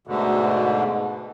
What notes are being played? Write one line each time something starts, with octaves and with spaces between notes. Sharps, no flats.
D2 G#2 B2 D3